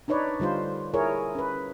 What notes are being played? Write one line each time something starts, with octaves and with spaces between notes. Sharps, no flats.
D4 D#4 B4 C#5 D5
D3 G3 F4 C5
E4 G#4 A#4 C#5
C#4 B4